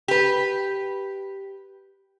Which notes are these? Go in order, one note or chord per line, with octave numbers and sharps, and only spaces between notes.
G4 B4